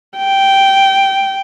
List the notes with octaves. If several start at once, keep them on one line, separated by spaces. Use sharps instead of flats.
G5